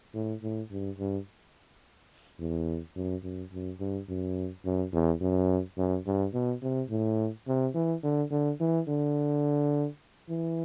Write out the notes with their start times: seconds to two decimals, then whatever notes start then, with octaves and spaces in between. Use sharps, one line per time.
0.14 A2
0.42 A2
0.71 G2
0.98 G2
2.39 E2
2.96 F#2
3.24 F#2
3.53 F#2
3.80 G2
4.09 F#2
4.65 F#2
4.93 E2
5.21 F#2
5.78 F#2
6.06 G2
6.34 B2
6.62 C3
6.90 A2
7.47 C3
7.74 E3
8.03 D3
8.31 D3
8.60 E3
8.88 D3
10.29 E3